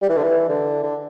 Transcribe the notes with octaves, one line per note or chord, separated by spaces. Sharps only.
G3
E3
D3
E3
D3
D3